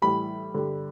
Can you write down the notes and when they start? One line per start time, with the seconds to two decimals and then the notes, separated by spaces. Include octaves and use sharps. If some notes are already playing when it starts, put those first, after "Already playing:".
0.02 A2 E3 G3 B5
0.54 G2 D3 G3